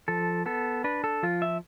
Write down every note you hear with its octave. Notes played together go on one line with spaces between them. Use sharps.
F3 A4
B3 A4
D4 B4
A4
F3 F4
E5